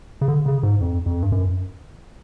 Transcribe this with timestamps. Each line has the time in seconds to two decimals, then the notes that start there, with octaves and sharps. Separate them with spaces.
0.21 C#3
0.28 D3
0.46 C#3
0.63 G#2
0.81 F2
1.06 F2
1.22 G2
1.32 F#2